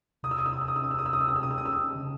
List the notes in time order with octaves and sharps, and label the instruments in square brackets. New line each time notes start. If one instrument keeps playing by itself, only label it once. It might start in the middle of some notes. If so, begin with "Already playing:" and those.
[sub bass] C3 [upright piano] D#6
[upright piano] E6
D#6
E6
D#6
E6
D#6
E6
D#6
E6
D#6
E6
D#6
E6
D#6
E6
D#6
E6
D#6
E6
D#6
[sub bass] C#3